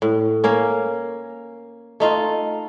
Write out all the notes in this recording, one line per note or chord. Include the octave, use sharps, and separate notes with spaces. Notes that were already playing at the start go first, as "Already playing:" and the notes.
A2
A#3 C#4
A3 D#4 F4